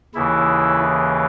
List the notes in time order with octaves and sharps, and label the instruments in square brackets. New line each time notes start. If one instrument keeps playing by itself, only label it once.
[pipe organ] D#2 C#3 E3 E4